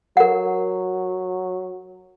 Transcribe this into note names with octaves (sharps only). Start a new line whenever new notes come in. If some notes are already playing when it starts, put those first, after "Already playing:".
F#3 A#4 F#5